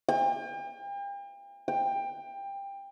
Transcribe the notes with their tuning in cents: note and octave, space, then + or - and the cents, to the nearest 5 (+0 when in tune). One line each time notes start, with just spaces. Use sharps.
G5 +40
G5 +20